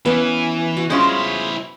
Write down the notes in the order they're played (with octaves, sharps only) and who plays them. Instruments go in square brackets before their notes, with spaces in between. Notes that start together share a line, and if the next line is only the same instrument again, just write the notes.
[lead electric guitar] E3 [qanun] B3 C#4 F5
[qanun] F#4
[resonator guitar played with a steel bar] G#3 C#4 F4 [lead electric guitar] E4 C5